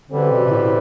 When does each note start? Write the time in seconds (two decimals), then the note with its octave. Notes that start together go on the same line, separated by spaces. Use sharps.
0.10 F#2 D3 E3 G3 C4
0.30 B2
0.46 B2
0.50 A2